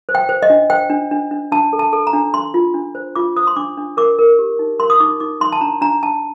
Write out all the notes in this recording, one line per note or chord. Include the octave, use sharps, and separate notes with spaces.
C5
G5
C5
D#5
D4
C5 G5
D4
D4
D4
D4 A5
A4
A5
A4
A#5
D4
D4 C6
F4
D4
C5
F4 D6
C5 D#6
C6
D4 D6
D4
A#4 D6
A#4
G4
D#4
A#4 C6
D#6
D#4 D6
D#4 D6
D#4 C6
A5
D4 A#5
D4 A#5
D4 A5